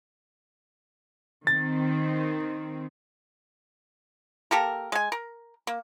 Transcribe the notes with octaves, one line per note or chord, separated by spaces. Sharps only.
D#3 C4 A6
A#3 G4 A4 A#4
G#3 G#5
A#4
A#3